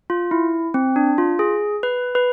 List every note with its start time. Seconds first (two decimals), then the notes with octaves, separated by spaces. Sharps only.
0.10 F4
0.31 E4
0.74 C4
0.96 D4
1.18 F4
1.39 G#4
1.83 B4
2.15 B4